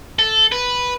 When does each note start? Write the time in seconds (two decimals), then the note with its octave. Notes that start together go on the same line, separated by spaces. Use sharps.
0.19 A4
0.52 B4